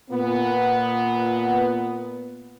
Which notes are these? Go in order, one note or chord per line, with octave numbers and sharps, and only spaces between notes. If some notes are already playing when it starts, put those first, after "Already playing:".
A#2 B3